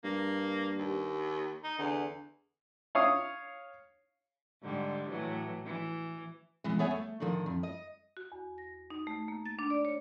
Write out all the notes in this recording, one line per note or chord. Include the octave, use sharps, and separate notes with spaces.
G2 A#3
D#2
D#4
E2 D3
C#5 F5 C#6 D#6
G#2 D3 G3
A2 E3 F#3
E3
B2 E3 G#3
B3 G#4 C#5 E5 G#5
A3
A2 D3 D#3 F3
F2
D#5
F#4
E2
A#6
D#4
A3
A#3
A6
D4
D5
C#5